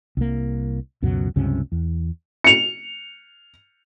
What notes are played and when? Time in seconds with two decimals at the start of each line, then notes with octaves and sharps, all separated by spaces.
0.17 C2 A#3
1.02 C#2 F#2 B2 F#3
1.36 C#2 G2 C3 C#4
1.72 E2
2.44 C#7 F7